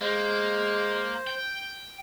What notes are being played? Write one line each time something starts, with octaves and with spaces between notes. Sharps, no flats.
G#3 A#3 C5
G5